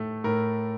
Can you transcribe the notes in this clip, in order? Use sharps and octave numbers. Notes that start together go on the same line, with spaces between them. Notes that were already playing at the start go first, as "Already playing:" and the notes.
Already playing: A2 A3
A2 A#4